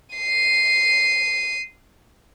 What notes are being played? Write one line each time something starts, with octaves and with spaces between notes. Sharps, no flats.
C7 D#7